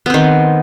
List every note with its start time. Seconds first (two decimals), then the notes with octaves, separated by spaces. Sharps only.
0.06 B3
0.10 C4
0.14 D#3